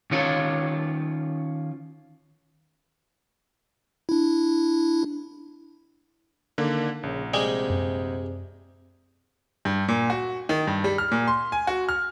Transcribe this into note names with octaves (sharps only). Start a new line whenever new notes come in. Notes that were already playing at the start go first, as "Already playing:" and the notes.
D#3 C#4 F4 C#5
D4 E4
D3 D#3 A#3
A#1 C#3
C3 G3 G#3
F#2
G2
A#2
F#4
D#3
G2
G3
F6
A#2
C6
G#5
F#4
F6